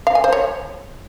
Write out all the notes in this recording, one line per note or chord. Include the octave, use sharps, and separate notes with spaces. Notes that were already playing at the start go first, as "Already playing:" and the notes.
F5
G#5
C5
C#5